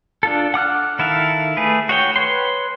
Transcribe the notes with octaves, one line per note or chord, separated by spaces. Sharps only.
D4 F4 A4
F#5 D6 F6 F#6
D#3 E4 A4 E5 F5
A3 G#4 B4
F#4 C#5 G5
B4 C#5 C6